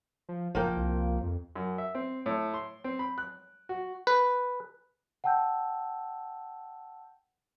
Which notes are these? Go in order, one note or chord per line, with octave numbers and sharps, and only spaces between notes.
F3
F#1 F3 A#3 G5
C2
F2
F#2
E5
C4
A2
C6
C4
B5
F#6
F#4
B4
F#5 G5 A5 E6 G6